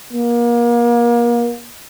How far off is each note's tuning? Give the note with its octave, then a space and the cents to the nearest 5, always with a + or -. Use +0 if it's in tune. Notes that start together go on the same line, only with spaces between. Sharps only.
A#3 +30